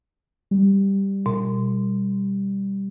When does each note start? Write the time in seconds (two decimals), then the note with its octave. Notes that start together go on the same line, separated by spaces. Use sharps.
0.51 G3
1.26 B2